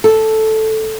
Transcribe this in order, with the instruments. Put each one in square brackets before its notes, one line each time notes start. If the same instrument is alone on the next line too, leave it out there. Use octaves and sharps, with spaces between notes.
[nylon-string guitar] A4